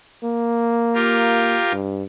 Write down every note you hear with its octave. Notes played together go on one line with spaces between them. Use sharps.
A#3
F4 G4 A#4
G2